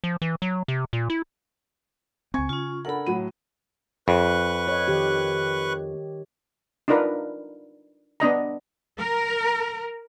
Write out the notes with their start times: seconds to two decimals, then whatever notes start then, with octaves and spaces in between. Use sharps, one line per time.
0.04 F3
0.22 E3
0.42 F#3
0.68 C3
0.93 A#2
1.10 E4
2.34 C#2 C4 G#5 C#6 G#6
2.49 C#3 C#4 F4
2.85 D4 A4 A#4 F#5 B5
3.06 A2 F#3 D#7
4.08 F2 B4 C#6 F#6
4.68 C#5 D#5
4.88 D#3 G4
6.88 D4 D#4 F4 A#4 B4
8.20 B3 D4 D#5 A#5
8.98 A#4